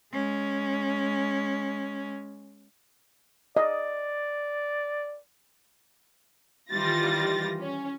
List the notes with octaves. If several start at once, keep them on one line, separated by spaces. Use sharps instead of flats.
G#3 C#4
D5 D#5
D#3 E3 G3 F4 A6 A#6
C#4